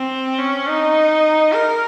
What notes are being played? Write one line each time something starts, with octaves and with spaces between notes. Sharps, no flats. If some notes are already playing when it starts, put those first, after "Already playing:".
Already playing: C4
C#4
D#4
A#4